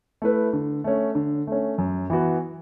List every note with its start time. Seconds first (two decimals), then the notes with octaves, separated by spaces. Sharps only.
0.22 A3 E4 B4
0.53 D3
0.84 A3 C#4
1.15 D3
1.47 A3 C#4
1.78 F#2
2.10 E3 B3 F#4